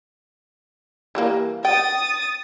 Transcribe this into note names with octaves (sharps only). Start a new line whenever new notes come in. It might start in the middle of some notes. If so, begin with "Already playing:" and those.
E3 G3 A#3
G5 D#6 A6